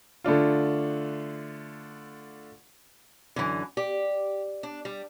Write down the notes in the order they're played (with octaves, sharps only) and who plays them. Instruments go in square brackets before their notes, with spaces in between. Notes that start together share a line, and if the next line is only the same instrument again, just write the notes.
[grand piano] D3 A3 D4 F4
[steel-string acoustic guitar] F#2 [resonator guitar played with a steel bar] D3 E3
[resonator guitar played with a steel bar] G4 [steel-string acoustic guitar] D5
[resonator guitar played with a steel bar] D4
G3